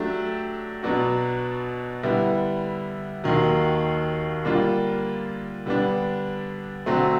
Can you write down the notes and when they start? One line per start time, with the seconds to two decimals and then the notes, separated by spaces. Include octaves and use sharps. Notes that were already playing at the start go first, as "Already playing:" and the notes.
Already playing: F#3 A3 D4 G4
0.83 B2 F#3 B3 D4 F#4
2.03 D3 G3 B3 E4
3.24 D#2 D#3 F#3
4.45 D3 G3 A#3 D4 F4
5.66 D3 G3 B3 D4
6.86 D3 F#3 A3 C4